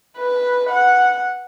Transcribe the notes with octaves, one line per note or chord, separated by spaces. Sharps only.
B4
F#5